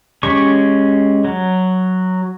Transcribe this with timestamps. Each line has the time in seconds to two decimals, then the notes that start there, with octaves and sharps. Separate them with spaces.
0.23 G#3 C#4 G4 C#6
1.25 F#3